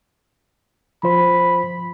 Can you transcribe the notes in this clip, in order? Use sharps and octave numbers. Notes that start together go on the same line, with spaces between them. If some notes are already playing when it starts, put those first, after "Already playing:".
F3 F4 C5 B5